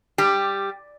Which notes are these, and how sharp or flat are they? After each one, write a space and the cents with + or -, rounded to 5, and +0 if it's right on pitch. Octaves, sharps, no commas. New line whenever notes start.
G3 +0 G4 +10